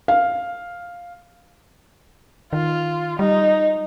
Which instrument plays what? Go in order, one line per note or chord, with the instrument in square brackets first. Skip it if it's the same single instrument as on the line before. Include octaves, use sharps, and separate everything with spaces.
[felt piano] F5
[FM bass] D#3 [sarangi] F4
[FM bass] G3 [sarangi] D#4